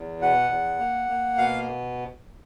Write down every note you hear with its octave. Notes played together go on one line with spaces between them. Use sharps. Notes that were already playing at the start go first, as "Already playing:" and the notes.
Already playing: E2
B2 F#5
E2
A#3
A#3
B2 F5